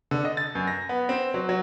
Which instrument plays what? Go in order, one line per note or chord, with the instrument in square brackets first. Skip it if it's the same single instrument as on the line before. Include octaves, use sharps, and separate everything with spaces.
[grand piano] D3
D#5
A6
F#2
A#6
B3
C4
F#3
F#3